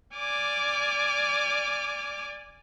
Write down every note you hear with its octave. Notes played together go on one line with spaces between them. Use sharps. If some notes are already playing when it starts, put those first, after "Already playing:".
D5 G#5 D6 F6